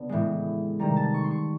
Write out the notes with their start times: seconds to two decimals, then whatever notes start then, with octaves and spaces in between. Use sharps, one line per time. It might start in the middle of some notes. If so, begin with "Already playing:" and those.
Already playing: C#3 B3 D4
0.09 A2 E3 G#3
0.79 C3 D#3 G3 A#5
0.97 A5
1.14 C#6
1.24 C6
1.31 C#6